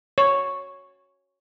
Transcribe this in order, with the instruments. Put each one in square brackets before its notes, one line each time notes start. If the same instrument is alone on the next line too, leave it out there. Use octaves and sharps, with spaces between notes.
[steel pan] C#5